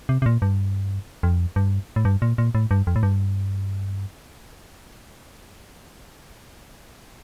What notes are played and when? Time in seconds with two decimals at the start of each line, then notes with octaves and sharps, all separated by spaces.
0.09 C3
0.22 C3
0.26 A#2
0.42 G2
1.23 F2
1.56 G2
1.96 A2
2.05 G2
2.22 A#2
2.38 A#2
2.55 A2
2.71 G2
2.87 F2
2.96 A2
3.03 G2